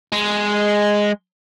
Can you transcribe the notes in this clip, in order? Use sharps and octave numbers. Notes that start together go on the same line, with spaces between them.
G#3